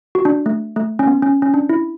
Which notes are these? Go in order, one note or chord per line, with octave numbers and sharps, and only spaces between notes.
F#4
D4
A3
A3
C#4
B3
C#4
C#4
D4
E4